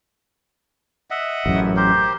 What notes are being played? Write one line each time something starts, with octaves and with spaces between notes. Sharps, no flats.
D#5 E5 F#5
A1 F#2
G4 A#4 C5